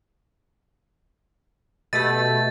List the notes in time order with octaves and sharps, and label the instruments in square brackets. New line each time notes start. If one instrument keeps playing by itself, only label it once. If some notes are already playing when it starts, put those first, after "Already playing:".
[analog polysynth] B2 A3 [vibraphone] G4 D#5 [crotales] A6